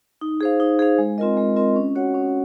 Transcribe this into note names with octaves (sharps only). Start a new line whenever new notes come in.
D#4
G#4 C5 F5
D#4
G#4 C5 F5
G#3
C4 F4 A#4 D#5
G#3
C4 F4 A#4 D#5
C#4
F#4 C#5 F#5
C#4